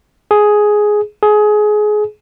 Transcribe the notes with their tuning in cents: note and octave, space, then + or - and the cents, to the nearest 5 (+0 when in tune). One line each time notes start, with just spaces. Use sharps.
G#4 +5
G#4 +20